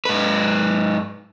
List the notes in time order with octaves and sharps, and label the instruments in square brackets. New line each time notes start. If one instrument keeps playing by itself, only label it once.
[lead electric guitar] G#2 B4